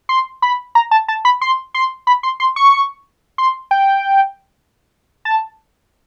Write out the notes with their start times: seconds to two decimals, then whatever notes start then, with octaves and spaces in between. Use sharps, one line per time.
0.09 C6
0.42 B5
0.75 A#5
0.91 A5
1.08 A5
1.25 B5
1.41 C6
1.74 C6
2.07 B5
2.23 C6
2.40 C6
2.56 C#6
3.38 C6
3.71 G5
5.25 A5